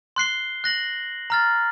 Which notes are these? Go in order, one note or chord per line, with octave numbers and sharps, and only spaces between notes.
C6 F#6 C7 G7
F#6 A#6 F#7
A#5 F6 A6